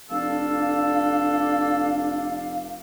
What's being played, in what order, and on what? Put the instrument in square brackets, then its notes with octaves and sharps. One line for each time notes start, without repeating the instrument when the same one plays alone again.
[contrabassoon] F1 [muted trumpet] D4 [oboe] A4 [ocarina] F5